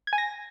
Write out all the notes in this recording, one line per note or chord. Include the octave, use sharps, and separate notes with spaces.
G#6
G#5
A#6